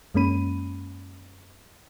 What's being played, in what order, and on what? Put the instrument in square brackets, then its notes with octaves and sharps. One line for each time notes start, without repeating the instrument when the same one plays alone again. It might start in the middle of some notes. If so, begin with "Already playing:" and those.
[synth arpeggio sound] F#2 G#3 A#3 C#4 B5 D#7